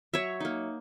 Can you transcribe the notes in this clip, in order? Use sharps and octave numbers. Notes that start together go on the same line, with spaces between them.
F#3 C#5 E5
A#3 D#4